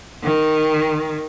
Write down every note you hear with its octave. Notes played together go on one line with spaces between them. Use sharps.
D#3